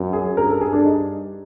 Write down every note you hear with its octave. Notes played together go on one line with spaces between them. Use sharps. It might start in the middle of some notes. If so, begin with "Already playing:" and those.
Already playing: F#2
G#4
G2 A#4
A4
G#4
D4
D#4